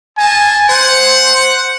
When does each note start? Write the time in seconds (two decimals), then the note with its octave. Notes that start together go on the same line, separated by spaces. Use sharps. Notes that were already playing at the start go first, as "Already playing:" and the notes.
0.17 F4 D#5 G#5 A5
0.69 C5 F#5